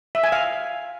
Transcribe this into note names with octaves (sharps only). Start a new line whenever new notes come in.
E5
G#5
F5